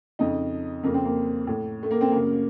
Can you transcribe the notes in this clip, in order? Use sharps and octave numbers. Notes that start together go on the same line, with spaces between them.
F2 C#3 D#4
F2 C#3 A#3
C4
A#3
A2
A3
A#3
C4
F#2 C#3 A#3